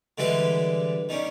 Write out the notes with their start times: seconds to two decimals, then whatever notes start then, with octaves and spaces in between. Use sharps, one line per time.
0.18 D3 E3 G3 G#3 G4 B4
1.09 D#3 G3 C#4